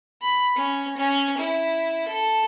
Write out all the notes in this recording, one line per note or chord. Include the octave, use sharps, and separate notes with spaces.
B5
C#4
C#4
E4
A4